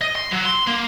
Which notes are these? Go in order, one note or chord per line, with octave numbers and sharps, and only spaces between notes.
D#5
C6
F#3
C6
A#3